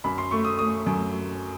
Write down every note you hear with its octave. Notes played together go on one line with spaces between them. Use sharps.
F#2 B5
C6
A3 C#6
D#6
A3 D#6
F#2